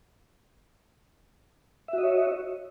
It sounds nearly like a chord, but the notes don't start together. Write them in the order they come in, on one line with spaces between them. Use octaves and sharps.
E5 F#4 D#5 C#5